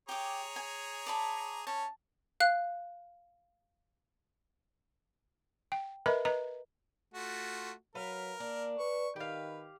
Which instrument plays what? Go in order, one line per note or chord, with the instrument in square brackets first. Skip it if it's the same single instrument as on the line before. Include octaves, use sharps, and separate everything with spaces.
[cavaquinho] G4 D6 [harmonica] G#4 C#5 A#5
[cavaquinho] G#5
D5 A5 B5
[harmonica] C#4 [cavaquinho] A5
[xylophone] F5 F#6
[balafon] G5
A#4 B4 D#5 E5 A#5 B5
B4 D#5 A#5
[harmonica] A3 F4 F#4
[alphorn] F#3 [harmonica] A#4 [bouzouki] B4 F5
[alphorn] A#3 [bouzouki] D4
[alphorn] B4 [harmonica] C#6
[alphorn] D#3 [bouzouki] G4 F5 [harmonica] B4